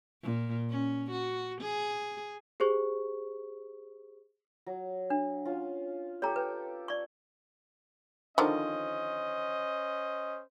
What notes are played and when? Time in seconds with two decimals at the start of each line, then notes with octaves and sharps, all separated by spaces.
0.22 A#2
0.70 C#4
1.11 F#4
1.61 G#4
2.60 G4 G#4 C5 C#6
4.66 F#3
5.10 D4
5.45 C#4 F4
6.22 G4 A4 C#5 G#5 A#5
6.36 B4 G5
6.88 D5 C#6
8.38 D3 D#3 F3 C#4 C5 D#5